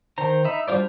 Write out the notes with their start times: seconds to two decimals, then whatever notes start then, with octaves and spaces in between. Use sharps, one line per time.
0.18 D#3 C5 A#5
0.45 D#4 E5 B5
0.68 G3 D4 F4 C5 D5